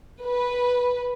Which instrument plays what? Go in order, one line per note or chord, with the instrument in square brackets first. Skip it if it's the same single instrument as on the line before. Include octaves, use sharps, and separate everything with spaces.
[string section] B4